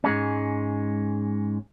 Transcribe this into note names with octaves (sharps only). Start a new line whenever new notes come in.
G#2 G#3 C#4